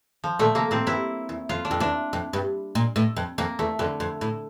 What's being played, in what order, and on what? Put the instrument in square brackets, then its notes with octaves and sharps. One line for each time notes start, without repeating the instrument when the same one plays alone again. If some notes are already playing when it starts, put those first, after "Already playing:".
[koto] F3
[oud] A#2 D3 [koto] A3
[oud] C3 [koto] A#3
[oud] A2 [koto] C4
[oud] G2 [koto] E4
[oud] E2
[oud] F2 [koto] F4
[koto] D4
[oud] F2
[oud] E2 [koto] D4
[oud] F2
G2
A#2
A2
F2
[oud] F2 [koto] A#3
[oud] E2 [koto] A3
[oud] F2 [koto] D3
[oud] F2
A2